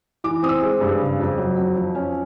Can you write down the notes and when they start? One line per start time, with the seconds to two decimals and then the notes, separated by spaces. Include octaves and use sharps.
0.24 E3 D6
0.43 C4 D#6
0.49 E6
0.62 G#3
0.81 G2
1.00 C#3
1.20 F2
1.38 F#3
1.58 F2
1.76 F3
1.95 C#4